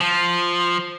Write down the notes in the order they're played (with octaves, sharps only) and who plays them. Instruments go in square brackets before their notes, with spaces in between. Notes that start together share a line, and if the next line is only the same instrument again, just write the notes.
[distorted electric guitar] F3